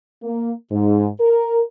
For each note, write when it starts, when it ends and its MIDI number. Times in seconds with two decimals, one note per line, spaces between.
0.23 0.52 58
0.72 1.07 44
1.20 1.62 70